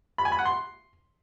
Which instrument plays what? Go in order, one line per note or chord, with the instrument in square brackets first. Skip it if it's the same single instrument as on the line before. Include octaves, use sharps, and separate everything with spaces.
[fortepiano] B5
G#5
B5
F#5
C6